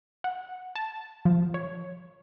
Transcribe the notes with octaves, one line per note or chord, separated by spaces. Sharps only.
F#5
A5
F3
C#5